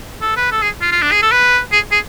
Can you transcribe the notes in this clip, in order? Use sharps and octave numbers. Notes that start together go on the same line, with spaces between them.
A4
B4
A4
G#4
F4
F4
D4
G#4
A4
B4
G#4
G#4